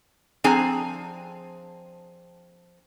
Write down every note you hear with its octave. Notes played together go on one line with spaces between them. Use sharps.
F3 C4 D4 G#4 G#5 A#5